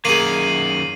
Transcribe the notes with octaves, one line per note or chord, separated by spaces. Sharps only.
F#2 D#3 A#3 G#4 C7 D#7 F#7